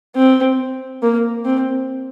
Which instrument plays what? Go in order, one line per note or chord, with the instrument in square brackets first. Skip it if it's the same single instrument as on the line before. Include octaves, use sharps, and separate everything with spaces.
[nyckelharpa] C4
A#3
C4